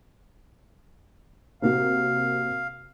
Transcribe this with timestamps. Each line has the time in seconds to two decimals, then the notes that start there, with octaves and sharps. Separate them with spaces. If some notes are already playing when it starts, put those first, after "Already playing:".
1.62 C3 A#3 F#4 F5